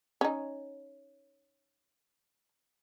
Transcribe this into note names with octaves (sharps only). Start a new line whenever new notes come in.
C#4 D#4